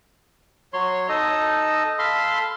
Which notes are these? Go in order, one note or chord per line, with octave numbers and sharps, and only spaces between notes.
F#3 C#5 C6
D#4 A4 D#5
A4 F5 B5 C6